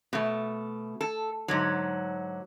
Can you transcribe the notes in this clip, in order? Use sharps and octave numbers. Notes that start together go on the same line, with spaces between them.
B2 A3
A4
G#2 D3 F#3